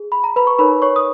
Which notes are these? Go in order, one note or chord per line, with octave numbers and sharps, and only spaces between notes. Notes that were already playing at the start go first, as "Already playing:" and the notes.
Already playing: G#4
B5
A#5
B4 B5
C#6
D#4 A#4 B4 C#5 B5
C#5 C#6
D#6